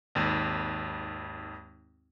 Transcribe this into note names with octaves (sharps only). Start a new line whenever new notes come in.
G#1 D#2